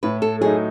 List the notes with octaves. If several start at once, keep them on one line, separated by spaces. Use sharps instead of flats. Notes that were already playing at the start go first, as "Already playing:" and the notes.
A2 B4
A4
F#3 A3 D#4 G#4